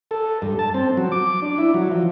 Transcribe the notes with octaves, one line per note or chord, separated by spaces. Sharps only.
A4
G2
A5
C4
F#3
D6
D4
E4
F#3
F3